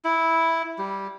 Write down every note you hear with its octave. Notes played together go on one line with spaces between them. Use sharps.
E4
G3